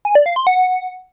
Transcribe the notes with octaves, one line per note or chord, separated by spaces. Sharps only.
G#5
D5
F5
C6
F#5